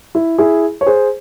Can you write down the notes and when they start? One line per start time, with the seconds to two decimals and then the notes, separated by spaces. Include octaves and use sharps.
0.15 E4
0.38 E4 G#4
0.81 C#5
0.86 G#4 C5